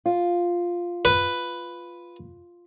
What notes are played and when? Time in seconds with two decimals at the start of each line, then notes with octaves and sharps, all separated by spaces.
0.06 F4
1.05 B4